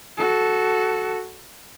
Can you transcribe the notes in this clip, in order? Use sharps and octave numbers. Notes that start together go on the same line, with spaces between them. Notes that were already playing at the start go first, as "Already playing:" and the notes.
F#4 A4